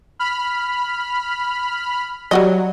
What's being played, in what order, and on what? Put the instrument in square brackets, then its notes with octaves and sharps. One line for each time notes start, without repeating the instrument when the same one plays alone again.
[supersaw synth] B5 F6
[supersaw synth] F#3 [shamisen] G3 F#4 D#5